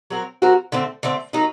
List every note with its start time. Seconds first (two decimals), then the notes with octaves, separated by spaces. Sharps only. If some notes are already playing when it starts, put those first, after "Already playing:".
0.10 F#3 C4 F#4 A#4
0.42 F#3 C4 F#4 A#4
0.72 D3 A3 C4
1.03 D3 A3 C4
1.33 F#3 A#3 D#4